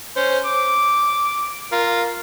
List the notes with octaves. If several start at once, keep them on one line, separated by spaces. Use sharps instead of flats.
C#4 C5
D6
F4 A#4